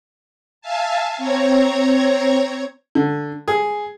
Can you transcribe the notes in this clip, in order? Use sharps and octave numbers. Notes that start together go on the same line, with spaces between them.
E5 F5 G#5 A5
C4 C#5 A#5 G#6
D3
G#4